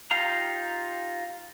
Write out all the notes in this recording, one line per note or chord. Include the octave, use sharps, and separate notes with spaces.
D#4 F4 G4 F5 A#5